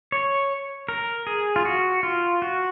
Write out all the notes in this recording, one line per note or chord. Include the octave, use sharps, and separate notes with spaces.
C#5
A#4
G#4
F4
F#4
F4
F#4